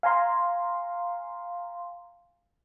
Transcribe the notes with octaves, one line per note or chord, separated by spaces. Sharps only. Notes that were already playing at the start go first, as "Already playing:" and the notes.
F5 G#5 A#5 C6